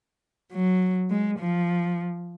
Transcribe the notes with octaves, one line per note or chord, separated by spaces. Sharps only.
F#3
G#3
F3